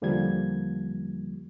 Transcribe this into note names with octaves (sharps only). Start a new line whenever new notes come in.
E2 D3 F3 G3 A#3 G#6